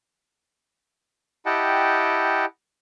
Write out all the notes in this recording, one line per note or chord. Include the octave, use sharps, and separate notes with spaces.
E4 G4 D#5 F#5 G5 A5